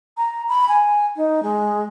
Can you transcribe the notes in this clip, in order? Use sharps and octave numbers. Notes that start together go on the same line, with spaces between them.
A#5
B5
G#5
D#4
G#3